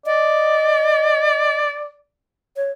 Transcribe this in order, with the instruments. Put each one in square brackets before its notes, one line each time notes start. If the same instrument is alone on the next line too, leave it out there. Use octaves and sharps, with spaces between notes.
[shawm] D5 [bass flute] D#5
[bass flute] C#5